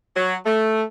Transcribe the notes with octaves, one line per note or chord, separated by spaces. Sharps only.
F#3
A3